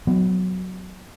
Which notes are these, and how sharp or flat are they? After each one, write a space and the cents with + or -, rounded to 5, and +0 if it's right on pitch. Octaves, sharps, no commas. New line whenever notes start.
F#3 +0 B3 +20